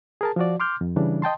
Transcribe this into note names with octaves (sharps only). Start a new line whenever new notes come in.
G#4 A#4 A5
F3 F4 F#4 D5
C6 D6 F6 G6
F2
C#3 E3 G3 D4
D#5 G5 A5 C6